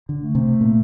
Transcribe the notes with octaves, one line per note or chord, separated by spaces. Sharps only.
D3
A3
C3
A#2